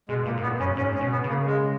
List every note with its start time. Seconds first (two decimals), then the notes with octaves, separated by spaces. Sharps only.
0.09 B2 G#3
0.26 A#2 A#3
0.37 G#2
0.42 A#2 B3
0.60 F#2 C#4
0.77 G#2 C#4
0.95 C#4
1.01 B2
1.12 B3
1.24 C#3 A#3
1.46 G#3